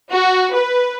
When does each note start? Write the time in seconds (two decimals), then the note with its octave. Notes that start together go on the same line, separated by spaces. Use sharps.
0.10 F#4
0.53 B4